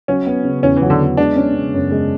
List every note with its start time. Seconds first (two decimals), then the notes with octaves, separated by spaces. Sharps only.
0.08 F#3 C#4
0.26 B3
0.44 C#3
0.63 E2 C#4
0.77 E3
0.82 F#3
0.90 D3
0.99 B3
1.17 G#3 D4
1.36 C#4
1.54 C#3
1.73 F#2
1.92 G#3